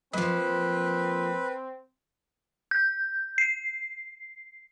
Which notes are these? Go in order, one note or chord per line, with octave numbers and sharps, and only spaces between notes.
F3 F#3 A#3 C4 B4
G6
C7